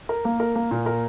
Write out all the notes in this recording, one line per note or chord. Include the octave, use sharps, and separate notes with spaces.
A#4
A#3
A#4
A#3
A#2
A#4